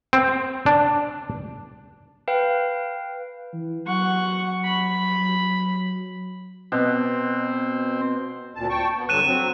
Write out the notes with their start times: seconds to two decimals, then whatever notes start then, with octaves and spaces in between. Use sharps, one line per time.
0.13 C4
0.66 D4
2.28 B4 F5 G5
3.53 E3
3.87 F#3 F#5 C#6
4.65 B5
6.72 B2 C4
8.55 D2 A#2 A5
8.70 G5 A5 C#6
8.97 B3
9.09 G2 D3 F#3 F#6 D#7 E7
9.27 F#3 C4